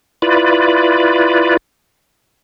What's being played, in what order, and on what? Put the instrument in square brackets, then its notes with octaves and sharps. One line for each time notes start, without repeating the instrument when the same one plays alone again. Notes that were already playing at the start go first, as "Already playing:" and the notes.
[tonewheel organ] E4 F4 B4 D5